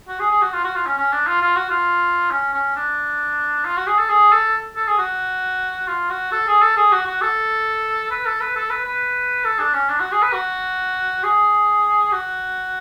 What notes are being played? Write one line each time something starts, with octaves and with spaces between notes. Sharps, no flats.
F#4
G#4
G#4
F#4
F4
F#4
F4
C#4
C#4
D4
F4
F4
F#4
F4
C#4
C#4
D4
F4
F#4
G#4
A4
G#4
A4
A4
G#4
F#4
F4
F#4
A4
G#4
A4
G#4
F#4
F#4
A4
B4
A4
B4
A4
B4
B4
A4
D4
C#4
D4
F#4
G#4
B4
F#4
G#4
F#4